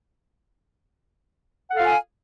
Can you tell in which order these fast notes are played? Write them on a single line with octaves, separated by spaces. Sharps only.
F#5 A4 F5 F4 G#5